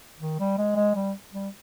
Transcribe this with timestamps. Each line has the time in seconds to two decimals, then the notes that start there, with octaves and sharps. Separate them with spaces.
0.20 D#3
0.40 G3
0.58 G#3
0.76 G#3
0.95 G3
1.32 G3